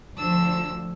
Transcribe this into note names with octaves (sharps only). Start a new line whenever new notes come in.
D2 F3 D4 E6